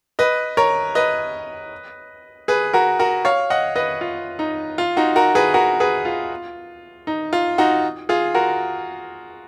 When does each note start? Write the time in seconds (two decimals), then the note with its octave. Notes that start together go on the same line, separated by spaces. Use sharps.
0.19 B4 D#5
0.57 A#4 C#5
0.95 B4 D#5
2.48 G#4 B4
2.73 F#4 A#4
2.99 F#4 A#4
3.25 C#5 F5
3.50 D#5 F#5
3.76 B4 D#5
4.01 F4
4.39 D#4
4.78 F4
4.97 D#4 F#4
5.16 F#4 A#4
5.35 G#4 B4
5.54 F#4 A#4
5.80 G#4 B4
6.05 F4
7.07 D#4
7.33 F4
7.58 D#4 F#4
8.09 F4 G#4
8.34 F#4 A#4